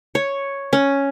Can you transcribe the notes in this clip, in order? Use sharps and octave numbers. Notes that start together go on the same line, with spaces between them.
C#5
C#4